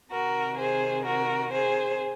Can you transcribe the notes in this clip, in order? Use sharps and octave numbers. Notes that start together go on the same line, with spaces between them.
C3 D#3 F#4 A#4
G#4 C5
F#4 A#4
G#4 C5